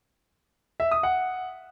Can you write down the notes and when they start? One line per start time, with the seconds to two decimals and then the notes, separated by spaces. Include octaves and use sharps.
0.80 E5
0.91 D#6
1.03 F#5